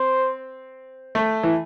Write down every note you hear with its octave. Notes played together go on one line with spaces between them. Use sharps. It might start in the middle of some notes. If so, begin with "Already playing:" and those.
Already playing: C4 C5
A3
E3